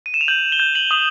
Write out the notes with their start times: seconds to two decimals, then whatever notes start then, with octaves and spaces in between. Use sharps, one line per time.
0.06 D#7
0.14 E7
0.21 F7
0.28 G6 F#7
0.52 G7
0.59 G6
0.75 F#7
0.91 D#6 F#7